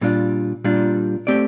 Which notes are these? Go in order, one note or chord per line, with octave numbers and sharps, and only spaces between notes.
A#2 G3 D4 F4
A#2 G3 D4 F4
A3 C4 G4 D5